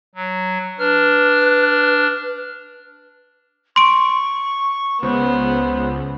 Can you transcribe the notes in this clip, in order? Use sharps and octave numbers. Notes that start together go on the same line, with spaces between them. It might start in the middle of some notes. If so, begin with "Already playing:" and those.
F#3
D4 B4 F6
C6 C#6 D7
C#2 B3 C5